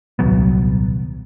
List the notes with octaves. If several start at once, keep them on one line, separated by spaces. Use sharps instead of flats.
D#1 C2 F#3 B3